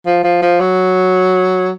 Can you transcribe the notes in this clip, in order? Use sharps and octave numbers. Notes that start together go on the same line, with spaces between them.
F3
F3
F3
F#3